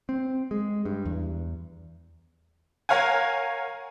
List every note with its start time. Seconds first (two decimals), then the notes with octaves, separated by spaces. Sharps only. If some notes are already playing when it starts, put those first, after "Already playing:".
0.09 C4
0.51 G#3
0.85 G2
1.05 E2
2.89 A#4 C#5 F5 F#5 G#5